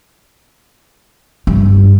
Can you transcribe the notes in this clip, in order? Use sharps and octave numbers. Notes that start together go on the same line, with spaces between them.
G2